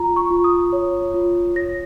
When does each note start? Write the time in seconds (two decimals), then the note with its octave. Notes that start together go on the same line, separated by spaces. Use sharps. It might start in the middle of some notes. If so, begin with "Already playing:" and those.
Already playing: F4 A#5
0.16 C#6
0.31 F4
0.44 D#6
0.73 C#5
1.14 F4
1.56 C#5 A#6